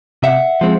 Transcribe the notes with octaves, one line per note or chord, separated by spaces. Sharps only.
C3 E5 F#5
F3 G#3 C4